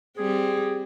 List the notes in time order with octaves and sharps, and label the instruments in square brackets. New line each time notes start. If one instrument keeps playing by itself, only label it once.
[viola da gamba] G3 C4 [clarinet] G#4